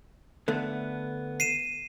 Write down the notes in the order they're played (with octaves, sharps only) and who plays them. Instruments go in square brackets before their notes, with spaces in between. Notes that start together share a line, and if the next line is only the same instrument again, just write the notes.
[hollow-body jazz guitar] D3 A3 B3
[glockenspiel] C7 D#7 E7